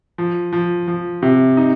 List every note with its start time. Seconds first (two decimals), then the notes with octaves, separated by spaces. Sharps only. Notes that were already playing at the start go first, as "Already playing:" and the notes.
0.18 F3
0.53 F3
0.88 F3
1.23 C3
1.57 D#4